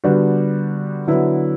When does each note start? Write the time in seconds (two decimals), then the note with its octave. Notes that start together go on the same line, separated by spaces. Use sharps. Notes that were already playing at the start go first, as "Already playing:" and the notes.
0.04 D3 G3 B3 D4 F#4
1.07 D3 F#3 B3 E4